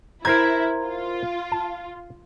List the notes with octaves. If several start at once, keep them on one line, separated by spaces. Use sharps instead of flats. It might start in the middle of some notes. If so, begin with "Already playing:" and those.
E4 A#4 C5 A#5 G#6
F4
A5